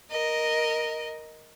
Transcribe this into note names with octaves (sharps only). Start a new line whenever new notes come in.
A#4 D#5